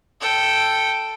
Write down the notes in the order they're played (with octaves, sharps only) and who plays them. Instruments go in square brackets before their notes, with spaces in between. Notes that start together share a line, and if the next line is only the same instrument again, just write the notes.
[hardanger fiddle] A4 G5